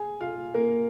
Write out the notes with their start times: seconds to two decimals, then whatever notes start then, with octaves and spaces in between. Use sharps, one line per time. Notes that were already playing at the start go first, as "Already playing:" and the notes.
Already playing: G#4 G#5
0.20 F4 F5
0.54 A#3 A#4